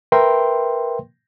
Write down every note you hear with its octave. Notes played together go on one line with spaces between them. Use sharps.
A#4 B4 E5 G5 C6